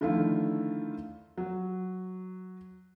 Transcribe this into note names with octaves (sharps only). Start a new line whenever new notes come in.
D3 D#3 F3 A3 E4 F4
F#3